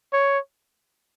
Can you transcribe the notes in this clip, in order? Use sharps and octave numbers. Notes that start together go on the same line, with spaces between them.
C#5